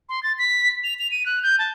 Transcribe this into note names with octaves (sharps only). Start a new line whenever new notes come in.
C6
A6
B6
F7
F7
D#7
F#6
G6
A5